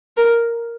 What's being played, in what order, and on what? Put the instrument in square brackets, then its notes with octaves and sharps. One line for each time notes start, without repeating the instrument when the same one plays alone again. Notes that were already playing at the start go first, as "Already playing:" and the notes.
[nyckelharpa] A#4